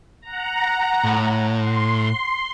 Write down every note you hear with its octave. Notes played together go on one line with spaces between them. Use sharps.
F#5 A#5
A2
C6